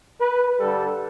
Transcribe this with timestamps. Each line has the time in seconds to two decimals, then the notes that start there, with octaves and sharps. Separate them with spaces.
0.20 B4
0.59 G2 D3 G3 A4